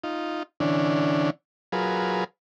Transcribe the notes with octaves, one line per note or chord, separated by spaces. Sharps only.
D#4 F4
D3 E3 C#4 D4
F#3 F4 G#4 A#4 B4